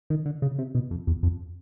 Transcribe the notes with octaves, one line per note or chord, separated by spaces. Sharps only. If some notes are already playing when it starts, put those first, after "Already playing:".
D#3
D3
C#3
C3
B2
F2
E2
F2